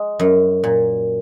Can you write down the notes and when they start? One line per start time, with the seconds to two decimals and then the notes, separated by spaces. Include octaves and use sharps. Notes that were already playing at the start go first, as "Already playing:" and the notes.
Already playing: G#3
0.19 F#2
0.64 A#2